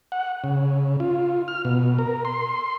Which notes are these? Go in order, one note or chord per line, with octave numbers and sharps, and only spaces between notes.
F#5
C#3
F4
F6
B2
A#4
C6